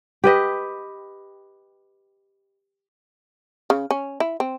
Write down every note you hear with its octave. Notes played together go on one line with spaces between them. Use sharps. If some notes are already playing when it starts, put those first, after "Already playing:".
G4 B4 D#5
C#3
C#4
E4
C4